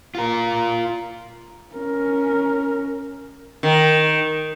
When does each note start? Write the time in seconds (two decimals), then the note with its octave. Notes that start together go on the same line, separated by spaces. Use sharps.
0.15 F4 A#4
1.75 C#4 A#4
3.63 D#3